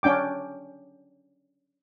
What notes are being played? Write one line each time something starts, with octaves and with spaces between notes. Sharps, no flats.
C#4 D4 G5 D6